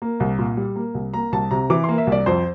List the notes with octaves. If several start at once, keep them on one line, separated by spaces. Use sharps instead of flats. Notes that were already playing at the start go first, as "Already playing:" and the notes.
A#3
C2
A#2
G3
A#3
C2
A#3 A#5
C2 A5
C3 A#5
E3 D6
A#3 C6
E5
C2
D5
F2 C5